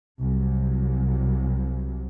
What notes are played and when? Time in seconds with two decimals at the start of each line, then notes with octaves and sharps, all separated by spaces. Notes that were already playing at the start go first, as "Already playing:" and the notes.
0.20 C2 C3 F#3